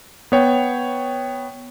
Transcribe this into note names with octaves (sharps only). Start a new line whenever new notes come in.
B3 C#5 G5